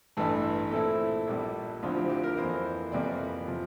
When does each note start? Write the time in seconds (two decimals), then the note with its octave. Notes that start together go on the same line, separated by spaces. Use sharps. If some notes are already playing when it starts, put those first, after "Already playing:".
0.17 A1 G2 E3 A3 A4
0.71 A#2 A3 C4 E4 A4
1.27 A#1 A#2 G3
1.83 D2 D3 F3 C4 E4 F4
1.97 G4
2.09 G4
2.24 A#4
2.37 F2 E3 A#3 E4 C5
2.92 F2 C3 E3 G3 A#3 D5
3.48 C3 F3